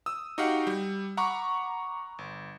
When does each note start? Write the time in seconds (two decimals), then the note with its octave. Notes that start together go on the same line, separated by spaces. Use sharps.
0.06 D#6 E6
0.38 D#4 F#4 G4 F5 F#5
0.67 G3
1.17 F#5 A#5 B5 C#6 D6
2.18 G1